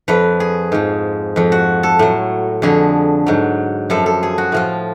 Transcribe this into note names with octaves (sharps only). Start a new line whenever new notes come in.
F2 F3 B4
G#4
G#2 F3
F2 F3
F#4
A4
A2 F#3
F2 D3 F3 G#4
G#2 F#3
F#2 F3 A4
A4
G#4
F#4
A2 F3 F4